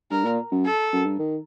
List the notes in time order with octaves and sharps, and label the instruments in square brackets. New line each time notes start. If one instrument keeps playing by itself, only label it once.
[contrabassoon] G2 [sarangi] A#4
[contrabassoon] A#2
F#2
[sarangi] A4
[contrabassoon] F#2
G2
D#3